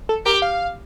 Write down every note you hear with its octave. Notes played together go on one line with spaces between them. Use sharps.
A4
G4 A#4
F5